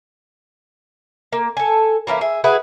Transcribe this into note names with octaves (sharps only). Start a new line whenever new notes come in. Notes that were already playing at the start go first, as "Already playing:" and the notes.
A#3
A4 G#5
E3 A#3 C#4 E4
G#4 E5
E4 F#4 G#4 B4